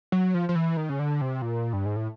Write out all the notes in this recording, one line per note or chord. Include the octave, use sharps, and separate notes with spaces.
F#3
F3
F3
E3
D#3
C#3
D3
C3
A#2
G2
G#2
A2